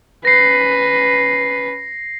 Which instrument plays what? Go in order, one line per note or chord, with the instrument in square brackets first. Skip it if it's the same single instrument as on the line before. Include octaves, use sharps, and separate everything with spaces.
[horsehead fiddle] C#4 B4 [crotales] A#6 C7